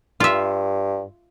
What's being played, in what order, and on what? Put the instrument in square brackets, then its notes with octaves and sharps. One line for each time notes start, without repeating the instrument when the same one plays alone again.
[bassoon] G2 [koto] F4 E5